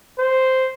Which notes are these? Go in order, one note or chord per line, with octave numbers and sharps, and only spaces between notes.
C5